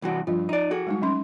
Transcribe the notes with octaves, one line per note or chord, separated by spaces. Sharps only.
C2 E3 F#4
G2 F3 F4
D#4 D5
F#4 G#4 A4
G3 G#3 D#4
F#3 C#4 C6